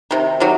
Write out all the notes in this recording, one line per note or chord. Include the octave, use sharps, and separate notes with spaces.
C3 D#3
C3 D#3 F#3